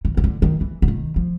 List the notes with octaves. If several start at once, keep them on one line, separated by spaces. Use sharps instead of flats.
D#3
D#3
D3
D#3
E3
D3
D#3
F3